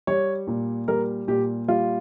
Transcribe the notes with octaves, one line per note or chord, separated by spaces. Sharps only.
G3 C#5
A#2
G3 A#4
A#2 G4
G3 F4